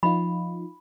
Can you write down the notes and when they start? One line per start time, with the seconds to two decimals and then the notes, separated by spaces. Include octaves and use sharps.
0.03 F3 D#4 F4 B5